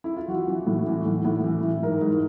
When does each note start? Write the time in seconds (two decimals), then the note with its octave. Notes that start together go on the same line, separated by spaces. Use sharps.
0.04 E4
0.17 F4
0.28 E3 F#4
0.48 E3
0.66 A2
0.87 E3
1.05 A2
1.25 A2
1.44 E3
1.63 E3
1.82 G#2 A#4
2.01 G#2